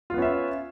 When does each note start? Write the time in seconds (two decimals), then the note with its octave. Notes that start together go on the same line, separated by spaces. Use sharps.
0.10 F4
0.14 B3
0.18 C#4
0.22 E5